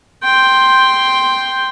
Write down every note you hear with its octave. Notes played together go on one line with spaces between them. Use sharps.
G5 C6